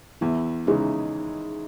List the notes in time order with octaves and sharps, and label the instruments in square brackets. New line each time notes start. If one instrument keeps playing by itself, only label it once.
[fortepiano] E2 [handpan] E4
[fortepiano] C#3 E3 G#3 [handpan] D#4